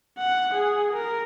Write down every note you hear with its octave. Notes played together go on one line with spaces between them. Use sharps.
F#5
G#4
A#4